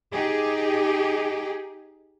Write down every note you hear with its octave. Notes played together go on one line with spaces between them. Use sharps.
D#4 G4 G#4